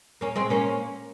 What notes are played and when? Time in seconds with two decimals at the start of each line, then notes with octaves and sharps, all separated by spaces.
0.21 A#3 C#4
0.36 G#3 C4
0.50 A#3 C#4